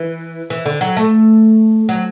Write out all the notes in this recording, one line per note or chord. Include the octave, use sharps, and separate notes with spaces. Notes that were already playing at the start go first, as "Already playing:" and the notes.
Already playing: E3
E3
D3
F#3
A3
F#3